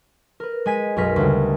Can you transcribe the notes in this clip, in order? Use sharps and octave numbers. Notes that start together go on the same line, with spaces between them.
A#4 B4
G#3 G#5 B6 D#7
B1 F#2 C#4 A#4 B4 B6
D2 C#3 G3